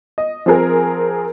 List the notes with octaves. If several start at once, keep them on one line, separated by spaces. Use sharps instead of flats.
D#5
F3 C4 G#4 A#4